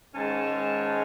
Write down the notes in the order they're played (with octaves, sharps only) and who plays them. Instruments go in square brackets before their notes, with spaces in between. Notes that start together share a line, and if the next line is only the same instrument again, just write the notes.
[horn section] G#2 D#3 G#3 C#4 A5